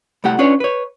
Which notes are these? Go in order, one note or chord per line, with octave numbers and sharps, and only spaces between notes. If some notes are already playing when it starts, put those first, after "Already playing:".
C2 A3 G4 F#5
C#4 D4 F4 B4 C#5
B4 C#5